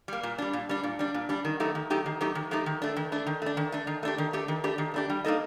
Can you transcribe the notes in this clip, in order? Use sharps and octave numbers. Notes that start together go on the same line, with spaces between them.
G3 A#3
A#2
G3 D4
A#2
G3 D4
A#2
G3 D4
A#2
G3 D4
D#3
F#3 A3 D#4 G4
D#3
F#3 A3 D#4 G4
D#3
F#3 A3 D#4 G4
D#3
F#3 A3 D#4 G4
D#3
A3 D4
D#3
A3 D4
D#3
A3 D4
D#3
A3 D4
D#3
A3 D4 G4
D#3
A3 D4 G4
D#3
A3 D4 G4
D#3
A3 D4 G4
G3
A#3 D#4 A4 D#5